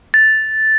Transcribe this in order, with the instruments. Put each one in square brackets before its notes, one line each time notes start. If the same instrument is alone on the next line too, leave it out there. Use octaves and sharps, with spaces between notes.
[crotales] A6